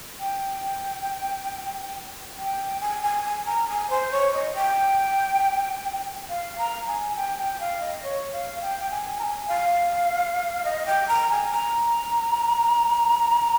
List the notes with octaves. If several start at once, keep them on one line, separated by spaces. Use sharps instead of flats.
G5
G5
G#5
G#5
G#5
A#5
G#5
C5
C#5
D#5
G5
F5
A#5
G#5
G5
G5
F5
D#5
C#5
F5
G5
G5
G#5
A#5
G#5
F5
D#5
G5
A#5
G#5
A#5